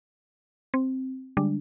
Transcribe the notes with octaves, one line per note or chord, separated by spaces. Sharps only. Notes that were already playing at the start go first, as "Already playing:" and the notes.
C4
D3 G3 G#3 D4